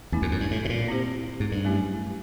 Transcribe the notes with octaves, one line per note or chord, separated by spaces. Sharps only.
E2 A3 C#4 E4
F2
F#2
G2
A2
B2
A#2
C4 E4 G4 C5
G#2
G2
F#3 A3 C#4 E4 G4